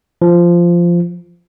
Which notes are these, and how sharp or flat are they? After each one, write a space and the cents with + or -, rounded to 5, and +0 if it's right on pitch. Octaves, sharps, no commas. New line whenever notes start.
F3 -10